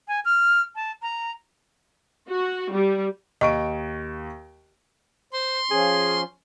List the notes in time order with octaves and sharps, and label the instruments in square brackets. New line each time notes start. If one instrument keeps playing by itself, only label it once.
[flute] G#5
F6
A5
A#5
[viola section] F#4
G3
[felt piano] D#2 C#6 D7 [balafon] D#5
[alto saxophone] C5 [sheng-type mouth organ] C6
[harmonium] F3 C#4 [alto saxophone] G#4